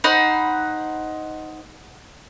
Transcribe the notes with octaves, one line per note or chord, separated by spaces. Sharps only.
D#4 C5 F#5 B5